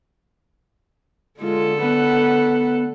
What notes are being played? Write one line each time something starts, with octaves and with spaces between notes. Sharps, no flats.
D3 G#3 F4 A4
A3 B3 B4 F#5 A5